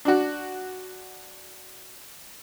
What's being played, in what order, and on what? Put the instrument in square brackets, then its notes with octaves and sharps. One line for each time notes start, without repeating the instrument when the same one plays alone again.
[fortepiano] D4 F#4